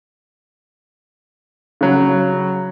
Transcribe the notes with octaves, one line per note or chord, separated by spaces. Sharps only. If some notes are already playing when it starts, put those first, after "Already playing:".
C#3 F#3